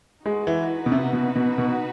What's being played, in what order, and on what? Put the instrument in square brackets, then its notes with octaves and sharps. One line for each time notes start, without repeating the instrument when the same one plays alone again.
[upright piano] G#3 [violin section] D#4 F#4 B4
[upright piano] E3
B2
C3
B2
B2
B2